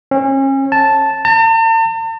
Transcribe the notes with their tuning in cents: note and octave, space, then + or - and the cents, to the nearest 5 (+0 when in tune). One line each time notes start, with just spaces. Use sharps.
C#4 -35
A5 -5
A5 +45